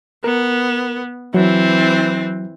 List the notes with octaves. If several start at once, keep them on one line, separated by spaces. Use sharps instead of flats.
B3 A#4
E3 F#3 C4